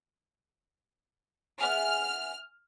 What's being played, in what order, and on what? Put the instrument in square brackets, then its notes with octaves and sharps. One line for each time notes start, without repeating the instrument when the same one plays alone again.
[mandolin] B3 E4 G#4 [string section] F6